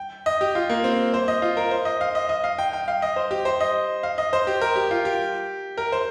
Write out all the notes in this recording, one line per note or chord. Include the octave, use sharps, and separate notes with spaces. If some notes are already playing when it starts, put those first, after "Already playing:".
Already playing: G5
D#5
G4
F4
A#3
C4
C5
D#5
F4
A#4
C5
D#5
F5
D#5
D#5
F5
G5
G5
F5
D#5
C5
G4
C5
D#5
F5
D#5
C5
G4
A#4
G4
F4
G4
A#4
C5